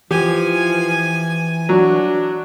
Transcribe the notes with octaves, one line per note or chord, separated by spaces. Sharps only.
E3 F3 G4 G#5
F#3 D4